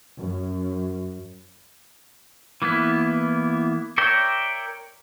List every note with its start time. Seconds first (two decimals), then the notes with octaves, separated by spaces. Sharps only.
0.18 F#2
2.62 E3 A#3 B3 E4
3.98 A#4 C#5 D5 E5 G5